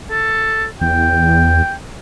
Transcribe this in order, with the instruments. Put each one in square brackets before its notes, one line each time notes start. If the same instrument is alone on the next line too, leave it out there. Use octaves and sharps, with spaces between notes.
[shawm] A4
[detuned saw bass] E2 [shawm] G5